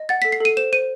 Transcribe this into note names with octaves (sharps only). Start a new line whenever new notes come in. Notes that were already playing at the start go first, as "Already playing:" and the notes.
Already playing: D#5
F#5 A6
B6
A4
C7
A4 D#7
C5 E7
C5 D#7